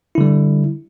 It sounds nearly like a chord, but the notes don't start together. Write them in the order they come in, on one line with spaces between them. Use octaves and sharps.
E4 D3 G3